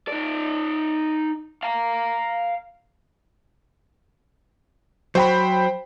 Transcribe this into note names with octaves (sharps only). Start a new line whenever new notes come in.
D#4 D5
F5 A#5
F#3 C5 G5 B5